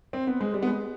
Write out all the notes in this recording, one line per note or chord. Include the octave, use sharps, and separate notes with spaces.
C4
B3
G#3
G3
B3
G#3